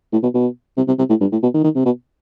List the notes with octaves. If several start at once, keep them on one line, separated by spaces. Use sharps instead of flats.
A2
B2
B2
C3
C3
C3
A2
G2
A2
B2
D#3
D#3
C3
B2